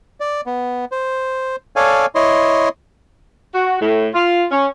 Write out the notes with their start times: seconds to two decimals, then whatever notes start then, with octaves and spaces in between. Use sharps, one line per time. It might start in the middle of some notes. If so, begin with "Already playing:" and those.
0.20 D5
0.46 B3
0.92 C5
1.76 A4 C#5 D5 F5 G#5
2.15 E4 C#5 D#5 C6
3.54 F#4
3.80 A2
4.13 F4
4.50 C#4